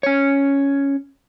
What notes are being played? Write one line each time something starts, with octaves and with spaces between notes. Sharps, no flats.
C#4 C#5